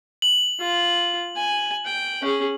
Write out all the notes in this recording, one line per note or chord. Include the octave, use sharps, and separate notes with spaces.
F#7
F4
G#5
G5
C#4 G#4